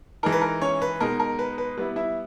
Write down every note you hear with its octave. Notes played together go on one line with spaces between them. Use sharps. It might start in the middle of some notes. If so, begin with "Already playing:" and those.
E3 G#3 D#4 A#4
B4
A#4
C#4 C#5
B4
B2 G#3 D#4 A#4
A#4
B4
B4
G3 B3 E4 B4
E4 E5